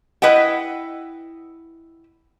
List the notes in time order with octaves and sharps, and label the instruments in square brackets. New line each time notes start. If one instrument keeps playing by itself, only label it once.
[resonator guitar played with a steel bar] E4 B4 D#5 F#5 G5